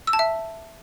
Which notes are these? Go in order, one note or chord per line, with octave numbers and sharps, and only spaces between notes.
E6
A5
E5